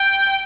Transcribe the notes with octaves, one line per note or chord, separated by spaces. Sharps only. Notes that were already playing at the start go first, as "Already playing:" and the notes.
Already playing: G5